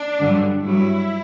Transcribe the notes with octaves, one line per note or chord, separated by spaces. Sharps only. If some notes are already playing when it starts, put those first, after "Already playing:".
Already playing: D4
G2 D3 F#3
G2 F#3 E4